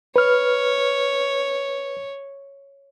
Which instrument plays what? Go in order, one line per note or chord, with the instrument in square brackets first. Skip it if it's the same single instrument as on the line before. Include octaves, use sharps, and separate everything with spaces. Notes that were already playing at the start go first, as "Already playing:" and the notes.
[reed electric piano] B4 F6 [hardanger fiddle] C#5